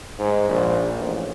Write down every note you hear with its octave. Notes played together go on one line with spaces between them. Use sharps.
G#2
A#1
A1